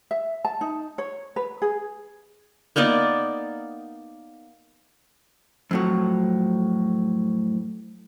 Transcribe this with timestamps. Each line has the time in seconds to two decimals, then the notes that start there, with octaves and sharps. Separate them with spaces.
0.11 E5
0.45 A5
0.61 D#4
0.98 C#5
1.36 B4
1.62 G#4
2.76 A#3 B3 D#4 D5
5.71 F2 A2 F#3